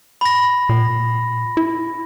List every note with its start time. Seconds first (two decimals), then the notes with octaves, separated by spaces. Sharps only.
0.21 B5 A#6
0.69 A#2
1.57 E4